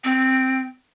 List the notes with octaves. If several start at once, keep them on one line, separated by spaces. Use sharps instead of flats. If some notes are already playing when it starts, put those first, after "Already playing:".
C4